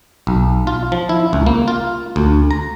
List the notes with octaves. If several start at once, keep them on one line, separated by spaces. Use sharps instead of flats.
B1
F4
F3
E4
C#2
A#3
F4
D2
A#5